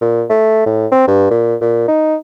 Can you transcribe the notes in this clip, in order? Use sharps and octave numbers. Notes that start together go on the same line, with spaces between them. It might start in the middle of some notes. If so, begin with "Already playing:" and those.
A#2
A3
A2
C4
G2
A#2
A#2
D#4